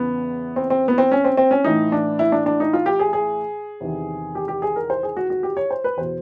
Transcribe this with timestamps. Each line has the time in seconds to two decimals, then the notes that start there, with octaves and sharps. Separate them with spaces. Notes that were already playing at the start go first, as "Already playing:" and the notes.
Already playing: E2 C#3 E3 B3
0.56 C4
0.70 C4
0.88 B3
0.98 C4
1.11 C#4
1.24 C4
1.37 C4
1.51 C#4
1.64 A2 E3 D#4
1.92 D4
2.19 E4
2.32 D4
2.46 D4
2.60 D#4
2.73 F4
2.86 G4
2.99 G#4
3.13 G#4
3.81 E2 C3 D#3
4.35 G4
4.48 G4
4.62 G#4
4.76 A#4
4.90 C5
5.03 G#4
5.17 F#4
5.30 F#4
5.43 G4
5.57 C#5
5.71 C5
5.84 B4
5.97 E2 B2 C5